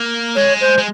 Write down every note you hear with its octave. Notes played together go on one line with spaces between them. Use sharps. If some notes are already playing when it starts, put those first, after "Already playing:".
Already playing: A#3
G#3 C#5
C5
G#3